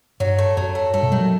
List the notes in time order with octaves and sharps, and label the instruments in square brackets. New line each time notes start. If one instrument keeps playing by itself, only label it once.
[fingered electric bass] G2 [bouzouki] F#3
[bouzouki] A3
[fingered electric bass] F#2 [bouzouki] F#3
[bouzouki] A3
[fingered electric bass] G2 [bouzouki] A3
[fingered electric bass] B2
[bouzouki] D#3 [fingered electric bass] G3
[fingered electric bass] F#3